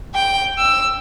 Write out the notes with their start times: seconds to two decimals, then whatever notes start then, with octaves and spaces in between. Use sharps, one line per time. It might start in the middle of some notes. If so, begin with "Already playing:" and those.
0.14 G5
0.58 E6